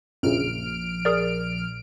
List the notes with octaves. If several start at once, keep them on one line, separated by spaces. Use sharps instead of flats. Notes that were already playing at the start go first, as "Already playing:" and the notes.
A#1 F#2 A#2 C#3 F6 D7
G#4 A#4 D5